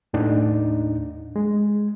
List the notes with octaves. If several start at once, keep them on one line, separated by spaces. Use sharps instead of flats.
D#2 A2 D4 D#4
G#3